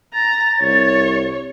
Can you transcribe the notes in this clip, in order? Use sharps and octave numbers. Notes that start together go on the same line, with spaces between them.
A#5 A6
C2 C#5